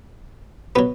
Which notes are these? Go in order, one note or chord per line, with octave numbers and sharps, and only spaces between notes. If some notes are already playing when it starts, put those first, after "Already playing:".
B2 F#3 B3